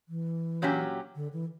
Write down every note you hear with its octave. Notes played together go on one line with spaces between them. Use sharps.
E3
A#2 F#3 C#4 G4
D3
E3